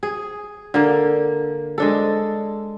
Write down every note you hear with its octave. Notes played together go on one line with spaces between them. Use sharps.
G#4
D3 A#3
G#3 D4 A4